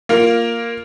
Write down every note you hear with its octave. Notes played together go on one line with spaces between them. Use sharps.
A#3 F4 A#4